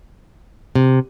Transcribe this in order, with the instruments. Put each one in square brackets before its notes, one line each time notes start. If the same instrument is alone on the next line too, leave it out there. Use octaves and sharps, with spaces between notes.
[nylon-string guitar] C3